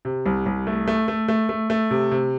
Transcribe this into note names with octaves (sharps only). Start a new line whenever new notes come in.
C3
C2
C2
A3
A3
A3
A3
A3
A3
C3
C3